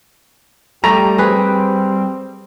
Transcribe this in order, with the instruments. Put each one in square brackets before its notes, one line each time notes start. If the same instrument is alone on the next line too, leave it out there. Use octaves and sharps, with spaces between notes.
[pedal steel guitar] G3 [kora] A3 [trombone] G4 [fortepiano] A#5
[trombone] C4 [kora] G#4 B4